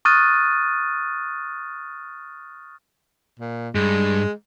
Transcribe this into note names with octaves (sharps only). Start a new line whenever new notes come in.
C#6 D#6 F6 F#6 A6 D#7
A#2
G2 G#3